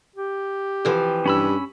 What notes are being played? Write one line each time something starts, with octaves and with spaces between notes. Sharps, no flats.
G4
C3 E3 F3
G2 C#4 B5 E6